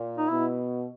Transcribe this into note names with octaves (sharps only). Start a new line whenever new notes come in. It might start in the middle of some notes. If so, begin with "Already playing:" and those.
Already playing: A#2
D#4
B2 E4